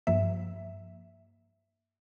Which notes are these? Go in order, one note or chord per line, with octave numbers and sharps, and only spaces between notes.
G2 F3 A#3 E5